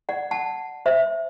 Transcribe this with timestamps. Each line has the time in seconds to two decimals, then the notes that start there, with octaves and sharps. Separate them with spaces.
0.09 D5 F#5
0.31 F#5 A5
0.86 C5 E5